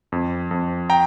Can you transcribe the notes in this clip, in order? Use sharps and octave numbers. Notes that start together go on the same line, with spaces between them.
F2
F2
G5 A#5